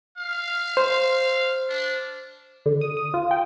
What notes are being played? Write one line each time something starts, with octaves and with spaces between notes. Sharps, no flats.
F5
C5
D4
D3
D#6
D#6
F4
G5